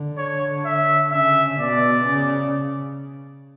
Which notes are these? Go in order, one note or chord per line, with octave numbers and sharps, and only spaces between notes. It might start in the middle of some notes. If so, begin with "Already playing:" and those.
Already playing: D3
C#5
E5
C#3 E5
B2 D5
C#3